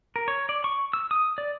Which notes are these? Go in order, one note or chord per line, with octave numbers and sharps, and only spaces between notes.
A#4
C#5
D5
C#6
E6
D#6
D5